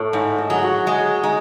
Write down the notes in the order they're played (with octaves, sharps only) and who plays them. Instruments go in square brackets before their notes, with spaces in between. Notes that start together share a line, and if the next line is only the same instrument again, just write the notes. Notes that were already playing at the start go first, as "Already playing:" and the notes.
Already playing: [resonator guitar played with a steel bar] A2 [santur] A4 C#5
[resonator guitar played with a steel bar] G#2 [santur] E5
[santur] D#5
[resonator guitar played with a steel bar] F#3 [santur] G#4
[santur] F#4
[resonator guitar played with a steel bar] G#3
[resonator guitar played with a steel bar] G#3 [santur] D#4